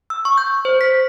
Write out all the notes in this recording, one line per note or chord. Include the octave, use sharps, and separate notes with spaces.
E6
C#6
G6
C5
B6